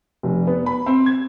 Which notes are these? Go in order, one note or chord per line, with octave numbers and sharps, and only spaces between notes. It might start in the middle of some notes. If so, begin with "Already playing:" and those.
F1
B3
B5
C4
G#6